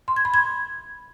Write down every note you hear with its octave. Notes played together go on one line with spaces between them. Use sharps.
C6
G#6
B5
G#6